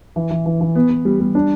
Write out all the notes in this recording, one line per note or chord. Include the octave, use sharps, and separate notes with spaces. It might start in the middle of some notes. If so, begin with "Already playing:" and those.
E3
E3
E3
E3
B3
B3
G3
G3
D4